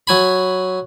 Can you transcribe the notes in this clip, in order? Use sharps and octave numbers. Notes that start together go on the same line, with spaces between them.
F#3 G#5 B5